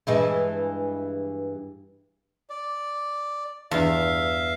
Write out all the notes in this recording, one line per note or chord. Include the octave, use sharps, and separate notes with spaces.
G2 E3 G#3
D5
E2 G2 E5 F5